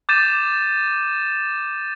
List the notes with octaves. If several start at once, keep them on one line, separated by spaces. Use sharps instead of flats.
D6 G6 A6 D#7 E7